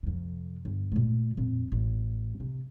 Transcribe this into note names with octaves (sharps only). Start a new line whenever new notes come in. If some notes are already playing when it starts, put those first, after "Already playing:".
F2 C3
G1
A#2 A3
F2 A#2
A1
C3